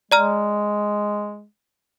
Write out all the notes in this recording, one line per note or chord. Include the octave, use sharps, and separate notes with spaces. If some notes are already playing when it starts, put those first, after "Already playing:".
G#3 D5 A#5 F6